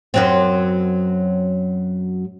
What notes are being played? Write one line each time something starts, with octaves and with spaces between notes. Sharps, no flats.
F#2 F#3 C4